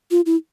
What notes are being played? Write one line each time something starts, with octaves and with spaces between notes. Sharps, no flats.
F4
E4